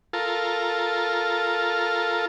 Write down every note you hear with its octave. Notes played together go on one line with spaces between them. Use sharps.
F4 A4 A#4